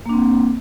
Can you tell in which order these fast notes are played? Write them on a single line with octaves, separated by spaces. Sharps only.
A#3 D4 C4